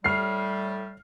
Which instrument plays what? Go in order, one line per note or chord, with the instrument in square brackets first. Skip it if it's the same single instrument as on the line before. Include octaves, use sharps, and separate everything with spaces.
[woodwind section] A2 G3 [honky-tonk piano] F6 C7